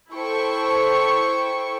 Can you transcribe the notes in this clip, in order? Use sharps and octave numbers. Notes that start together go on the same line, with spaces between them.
E4 A4 C5 G5 C#6